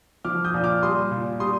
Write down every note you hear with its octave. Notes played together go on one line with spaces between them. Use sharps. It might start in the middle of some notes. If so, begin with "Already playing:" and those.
F3 D6 F6
D#6 G6
A#2
D6 F6
G3 C6 D#6
A#2
G3 C6 D#6